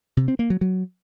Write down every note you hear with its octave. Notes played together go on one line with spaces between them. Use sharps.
C3
C4
A#3
F#3
F#3